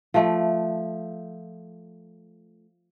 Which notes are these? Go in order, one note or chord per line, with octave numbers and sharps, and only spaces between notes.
F3 A3